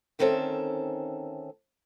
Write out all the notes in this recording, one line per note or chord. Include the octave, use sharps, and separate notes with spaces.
D2 D#3 C4 C#4 A4 E5